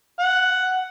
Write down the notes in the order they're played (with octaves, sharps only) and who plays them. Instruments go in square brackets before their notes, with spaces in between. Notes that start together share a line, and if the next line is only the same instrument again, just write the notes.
[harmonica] F#5